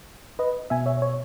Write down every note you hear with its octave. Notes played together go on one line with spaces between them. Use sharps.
B4 D#5
B2 E5 G#5
C#5 E5
C#5